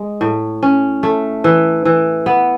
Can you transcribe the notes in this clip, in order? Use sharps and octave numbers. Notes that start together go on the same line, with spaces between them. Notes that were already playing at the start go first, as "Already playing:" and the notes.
Already playing: G#3
A2
C#4
A3
E3
E3
B3